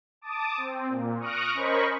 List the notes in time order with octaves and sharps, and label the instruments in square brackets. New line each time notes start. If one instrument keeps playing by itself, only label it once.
[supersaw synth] A5 D6 D#6
C4
A#2
C#6 D#6 F6 F#6 A#6 D7
C#4 A#4 C5 D#5 B5 C#6